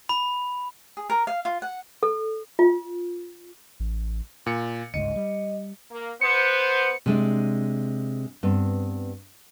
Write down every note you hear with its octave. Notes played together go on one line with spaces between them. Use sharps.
B5
G#4
A#4
F5
F4
F#5
A4
F4
A1
A#2 C#7
G1 C#2 G#2 D#5 C#7
G3
A#3
B3 C5 C#7
C3 G#3 D4
G2 B3 C4